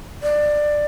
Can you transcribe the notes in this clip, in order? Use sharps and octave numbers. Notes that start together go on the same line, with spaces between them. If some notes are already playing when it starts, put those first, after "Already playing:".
D5